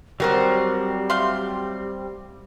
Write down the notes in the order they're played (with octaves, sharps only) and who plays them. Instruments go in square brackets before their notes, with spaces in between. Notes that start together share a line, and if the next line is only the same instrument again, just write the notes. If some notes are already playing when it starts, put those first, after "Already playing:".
[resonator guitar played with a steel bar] F#3 A#4 C5 [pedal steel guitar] G3 C4 [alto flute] G4
[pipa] A3 F5 C6